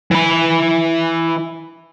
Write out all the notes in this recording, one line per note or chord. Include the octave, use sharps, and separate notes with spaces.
E3 B5